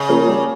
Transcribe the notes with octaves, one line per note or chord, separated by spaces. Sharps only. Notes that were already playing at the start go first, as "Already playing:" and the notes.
Already playing: C#3
F3 A#3 C#4 G#4
G3